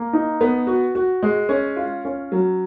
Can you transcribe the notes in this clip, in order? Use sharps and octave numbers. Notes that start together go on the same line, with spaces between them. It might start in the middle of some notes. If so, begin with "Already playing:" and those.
Already playing: A#3
D#4
B3
F#4
F#4
G#3
C#4
F4
C#4
F#3